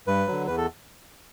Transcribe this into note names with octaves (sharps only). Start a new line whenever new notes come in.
G2 B4
D3 F#3
E2 B4
A4